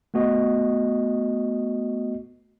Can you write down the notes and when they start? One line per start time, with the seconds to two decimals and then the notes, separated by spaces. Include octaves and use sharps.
0.14 A3 B3 F#4 D#5